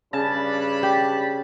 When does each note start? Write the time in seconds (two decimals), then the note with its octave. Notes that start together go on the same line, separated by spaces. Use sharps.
0.13 G2 C#3 D4 A5 B5
0.83 G4